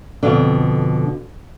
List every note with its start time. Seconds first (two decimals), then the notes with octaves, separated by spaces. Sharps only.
0.23 F2 B2 D3